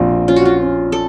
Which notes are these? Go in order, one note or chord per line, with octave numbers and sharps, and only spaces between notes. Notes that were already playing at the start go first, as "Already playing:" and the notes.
Already playing: A#1 C4
C#4 F4
F#4
F4
C#4
A4